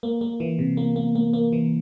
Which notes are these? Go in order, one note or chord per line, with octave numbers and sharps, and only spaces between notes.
A#3
A#3
E3
C3
A#3
A#3
A#3
A#3
E3